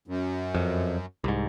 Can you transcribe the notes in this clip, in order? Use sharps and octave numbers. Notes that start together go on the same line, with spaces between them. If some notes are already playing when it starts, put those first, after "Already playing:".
F#2
F2
C2 G#2